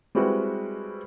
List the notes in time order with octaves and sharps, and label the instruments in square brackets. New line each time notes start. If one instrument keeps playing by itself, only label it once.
[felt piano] G3 G#3 C4 E4 F#4 B4